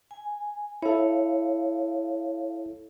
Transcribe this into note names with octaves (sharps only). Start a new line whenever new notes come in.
G#5
E4 A4 C#5 F5